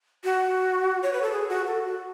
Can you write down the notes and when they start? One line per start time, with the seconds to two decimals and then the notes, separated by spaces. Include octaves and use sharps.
0.24 F#4
1.03 C#5
1.13 B4
1.22 A4
1.32 G#4
1.49 F#4
1.67 A4
1.85 F#4